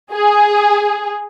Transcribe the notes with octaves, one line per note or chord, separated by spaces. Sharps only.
G#4